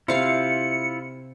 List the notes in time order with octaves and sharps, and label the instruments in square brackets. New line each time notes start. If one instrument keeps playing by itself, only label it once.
[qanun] C3 F5 [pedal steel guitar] E4 F4 [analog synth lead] C#7